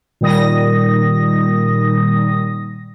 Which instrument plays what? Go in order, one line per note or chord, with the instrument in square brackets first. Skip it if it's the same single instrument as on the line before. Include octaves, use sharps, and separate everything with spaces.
[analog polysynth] A#2 D#3 G3 D#6 A#6